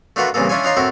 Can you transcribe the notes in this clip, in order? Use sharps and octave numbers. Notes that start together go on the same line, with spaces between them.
A3 D4 F4 F#4 A#4 B4
C2 A#2 C#3 E3 A#3 A4
C#4 D4 E4 F4 C#5 G#5
D4 D#4 F4 C#5 A#5 C6
A2 C4 E4 F#4 A#4